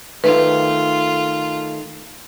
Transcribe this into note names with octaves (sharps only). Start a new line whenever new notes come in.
D#3 A3 F4 B4